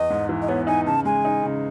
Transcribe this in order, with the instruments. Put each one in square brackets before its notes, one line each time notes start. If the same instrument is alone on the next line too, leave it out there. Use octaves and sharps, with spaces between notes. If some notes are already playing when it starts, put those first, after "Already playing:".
Already playing: [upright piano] E2 [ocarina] D#5
[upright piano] G#2
E3
[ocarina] D#5
[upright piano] B3 [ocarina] C#5
[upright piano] D#4 [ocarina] G#5
[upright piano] C#3 [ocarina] A5
[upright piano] G#3 [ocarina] G#5
[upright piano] D#4
C#3